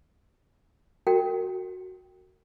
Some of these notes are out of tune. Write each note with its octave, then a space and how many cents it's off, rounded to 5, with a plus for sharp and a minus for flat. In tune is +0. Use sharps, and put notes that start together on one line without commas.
F#4 +0 A#4 -35 G5 +0